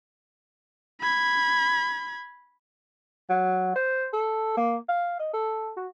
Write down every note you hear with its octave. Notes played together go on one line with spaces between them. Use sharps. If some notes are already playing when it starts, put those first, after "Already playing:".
B5 G#6
F#3
C5
A4
A#3
F5
D#5
A4
F#4